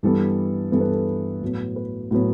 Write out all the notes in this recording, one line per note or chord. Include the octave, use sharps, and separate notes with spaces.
G2 E3 G3 B3 A4
G2 E3 G3 B3 A4
B4
A4
A2 F#3 B3
B4
A2 F#3 B3